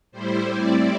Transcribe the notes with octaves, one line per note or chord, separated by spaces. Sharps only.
A2 G3 E4 C5
A2 G3 C4 E4 D5